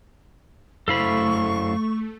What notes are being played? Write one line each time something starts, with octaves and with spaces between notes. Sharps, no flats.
F#2 A3 E4 A4 C5 F5 B5 C#6